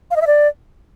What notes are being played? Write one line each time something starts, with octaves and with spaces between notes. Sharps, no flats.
F5
D#5
E5
D5